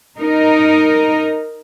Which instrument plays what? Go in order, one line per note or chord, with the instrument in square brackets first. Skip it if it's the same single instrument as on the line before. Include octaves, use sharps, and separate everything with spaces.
[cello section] D#4 A#4